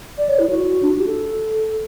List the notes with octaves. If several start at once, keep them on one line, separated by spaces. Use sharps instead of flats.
D5
C#5
E4
F#4
D4
F#4
G4
A4